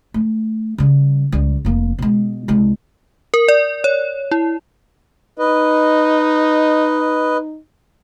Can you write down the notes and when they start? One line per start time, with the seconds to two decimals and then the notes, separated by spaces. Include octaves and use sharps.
0.14 A3
0.78 C#3 G3
1.32 C#2 G3
1.65 F1 A#3
1.99 B2 G#3
2.48 C2 G#3
3.34 A#4
3.48 D5
3.84 C#5
4.31 E4
5.39 D#4 B4 D#5